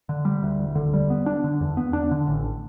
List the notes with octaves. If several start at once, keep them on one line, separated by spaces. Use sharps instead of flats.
D3
G3
D2
E1
D3
G3
B3
D4
D3
E2
B3
D4
D3
A1